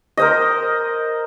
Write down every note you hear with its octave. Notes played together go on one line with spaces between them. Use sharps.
A#4 C5 D#5